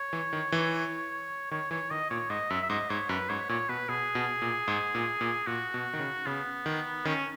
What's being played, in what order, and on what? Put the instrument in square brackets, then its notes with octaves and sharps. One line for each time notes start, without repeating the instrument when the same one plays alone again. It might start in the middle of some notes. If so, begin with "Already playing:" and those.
Already playing: [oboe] C#5
[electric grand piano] E3
D#3
E3
[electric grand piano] D#3 [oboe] C#5
[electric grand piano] E3 [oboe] C#5
[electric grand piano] D#3 [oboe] D#5
[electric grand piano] A#2 [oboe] C#5
[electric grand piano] G#2 [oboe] D#5
[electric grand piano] F#2 [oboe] E5
[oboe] E5
[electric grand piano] G#2 [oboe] D#5
[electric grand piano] G#2 [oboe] C#5
[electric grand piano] F#2 [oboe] B4
[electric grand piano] G#2 [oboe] C#5
[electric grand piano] A#2 [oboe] C#5
[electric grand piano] B2 [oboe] B4
[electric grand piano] B2 [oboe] G#4
[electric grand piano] B2
A#2
G#2
A#2
A#2
[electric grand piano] A#2 [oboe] F#4
[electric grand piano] B2
D#3
C#3
[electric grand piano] C#3 [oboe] B3
[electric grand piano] D#3
[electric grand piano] D#3 [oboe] C#4